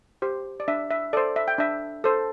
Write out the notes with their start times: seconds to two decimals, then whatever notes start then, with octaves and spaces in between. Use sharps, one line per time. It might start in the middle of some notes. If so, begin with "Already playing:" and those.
0.22 G4 C5
0.60 D5
0.68 D4 E5
0.91 E5
1.13 A4 C5 D5
1.36 E5
1.48 G5
1.58 D4 E5
2.04 A4 C5